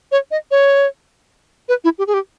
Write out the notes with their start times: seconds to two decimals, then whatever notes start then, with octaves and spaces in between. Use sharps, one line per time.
0.12 C#5
0.31 D#5
0.51 C#5
1.69 B4
1.84 E4
1.98 G4
2.07 G#4
2.14 G4